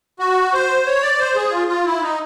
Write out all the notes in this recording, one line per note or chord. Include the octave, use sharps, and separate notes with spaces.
F#4
C5
C#5
D5
C5
G#4
F4
F4
E4
D#4